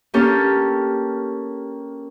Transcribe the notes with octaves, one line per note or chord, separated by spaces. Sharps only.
A#3 C#4 G4 A4